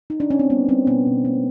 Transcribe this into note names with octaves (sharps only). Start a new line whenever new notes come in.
D#4
D4
C#4
C4
G3 B3
G3 C4
B2 B3
B2
A#3